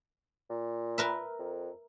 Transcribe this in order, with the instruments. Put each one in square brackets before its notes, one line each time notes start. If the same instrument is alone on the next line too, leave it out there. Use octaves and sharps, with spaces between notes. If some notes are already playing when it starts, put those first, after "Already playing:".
[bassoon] A#2
[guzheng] A#4 B4 E5
[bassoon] F2